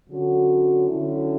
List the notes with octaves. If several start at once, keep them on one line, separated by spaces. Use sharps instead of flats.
D3 F#3 C#4 F#4
D3 F#3 C#4 E4